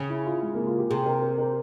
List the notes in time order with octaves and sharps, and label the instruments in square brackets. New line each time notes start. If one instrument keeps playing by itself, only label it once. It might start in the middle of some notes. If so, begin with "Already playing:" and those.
Already playing: [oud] C#3 [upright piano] C#4
[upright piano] E4
F4
G#3
A#3
F4
G4
[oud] C3 [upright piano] G#4
[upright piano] A#4
A#4
A#4